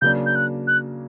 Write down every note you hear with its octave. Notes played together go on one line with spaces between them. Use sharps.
C#3 F#3 A#3 D4 G6
G6
F#6
F#6